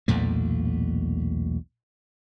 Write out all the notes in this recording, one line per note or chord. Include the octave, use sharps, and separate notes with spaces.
B1 E2 A#2 A3